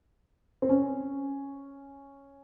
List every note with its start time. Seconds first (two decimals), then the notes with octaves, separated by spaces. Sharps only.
0.62 C4
0.69 C#4